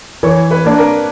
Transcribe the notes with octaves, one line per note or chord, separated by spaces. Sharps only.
E3 C#5
B4
A#3 D4
A#4